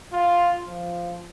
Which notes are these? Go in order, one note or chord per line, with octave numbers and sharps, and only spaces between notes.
F4
F3